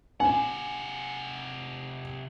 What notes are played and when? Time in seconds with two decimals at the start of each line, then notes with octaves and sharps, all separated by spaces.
0.20 C3 F#5 G#5